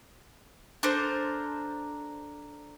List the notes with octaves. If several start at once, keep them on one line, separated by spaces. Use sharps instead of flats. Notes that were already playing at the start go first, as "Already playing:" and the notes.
D4 A4 A#4 C5